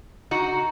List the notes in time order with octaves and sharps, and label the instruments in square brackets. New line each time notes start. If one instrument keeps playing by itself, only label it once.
[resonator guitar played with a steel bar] D#4 F#4